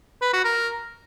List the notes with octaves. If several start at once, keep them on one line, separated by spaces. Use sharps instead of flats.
B4
F#4
A#4